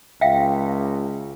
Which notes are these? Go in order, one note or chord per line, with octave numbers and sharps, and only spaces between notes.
C#2 E5 F5 G5